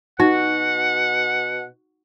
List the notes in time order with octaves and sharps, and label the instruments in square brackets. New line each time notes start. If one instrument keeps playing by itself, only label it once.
[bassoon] B2 [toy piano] D#4 [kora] F#4 [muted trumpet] F#5